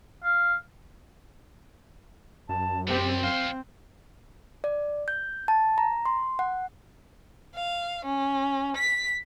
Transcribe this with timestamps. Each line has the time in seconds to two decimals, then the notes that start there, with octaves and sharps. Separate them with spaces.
0.24 F5
2.49 F#2 A5
2.88 C3 G3 C4 G4
3.23 F2 C5 F5
4.64 D5
5.08 G6
5.48 A5
5.78 A#5
6.06 C6
6.39 F#5
7.55 F5
8.05 C#4
8.77 B6